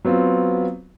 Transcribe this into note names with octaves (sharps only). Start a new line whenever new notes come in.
F#3 B3 C4 F4